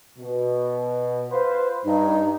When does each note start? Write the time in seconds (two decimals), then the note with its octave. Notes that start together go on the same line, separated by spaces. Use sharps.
0.18 B2
1.31 F4 B4 C5
1.85 G2 D#4